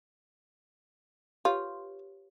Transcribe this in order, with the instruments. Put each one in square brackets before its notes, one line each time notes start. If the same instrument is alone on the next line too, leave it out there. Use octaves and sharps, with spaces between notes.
[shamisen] F4 [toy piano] G4 B4 C#5